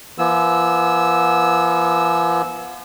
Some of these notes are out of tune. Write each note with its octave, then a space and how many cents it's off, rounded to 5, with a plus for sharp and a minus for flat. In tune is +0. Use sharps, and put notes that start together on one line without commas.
F3 -45 B3 -35 E6 -15